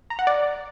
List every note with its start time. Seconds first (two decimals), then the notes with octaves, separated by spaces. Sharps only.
0.10 A#5
0.19 F#5
0.27 D5